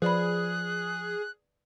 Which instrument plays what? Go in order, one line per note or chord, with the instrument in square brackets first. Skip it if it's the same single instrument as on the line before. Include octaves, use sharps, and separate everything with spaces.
[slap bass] F3 [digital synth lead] G#4 [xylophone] B4 D5 B5 [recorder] F#6